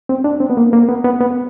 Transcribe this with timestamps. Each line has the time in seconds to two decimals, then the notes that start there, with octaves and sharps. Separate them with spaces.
0.09 C4
0.24 D4
0.40 C4
0.50 B3
0.57 A#3
0.73 A#3
0.89 B3
1.04 B3
1.21 B3